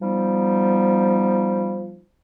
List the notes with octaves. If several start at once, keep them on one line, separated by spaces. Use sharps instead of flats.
F3 G3 B3 D#4